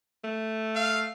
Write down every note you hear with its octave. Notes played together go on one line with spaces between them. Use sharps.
A3
F5